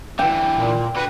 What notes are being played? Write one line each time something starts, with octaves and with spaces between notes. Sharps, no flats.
D3 E3 G5
A#2
D3 F#4 B4